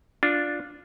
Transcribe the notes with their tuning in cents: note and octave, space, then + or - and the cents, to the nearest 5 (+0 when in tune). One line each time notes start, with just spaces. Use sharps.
D4 +0 F4 +10